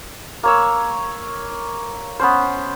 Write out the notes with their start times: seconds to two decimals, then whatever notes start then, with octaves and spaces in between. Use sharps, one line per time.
0.43 A#3 C#5 E6
2.20 B3 C#4 C5